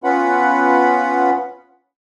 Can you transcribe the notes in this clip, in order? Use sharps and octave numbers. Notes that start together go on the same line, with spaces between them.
B3 C#4 F4 B4 F#5 B5